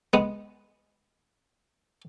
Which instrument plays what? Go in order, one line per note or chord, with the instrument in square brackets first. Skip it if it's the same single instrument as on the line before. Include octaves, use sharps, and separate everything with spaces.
[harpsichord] G#3 B3